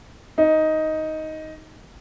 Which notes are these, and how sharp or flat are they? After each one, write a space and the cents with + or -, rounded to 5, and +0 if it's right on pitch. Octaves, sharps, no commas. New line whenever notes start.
D#4 +10